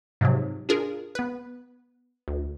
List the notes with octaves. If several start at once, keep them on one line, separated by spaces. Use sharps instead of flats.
G#2 C3 F3 F#3
D4 F4 G#4 A#4
B3 B4
D2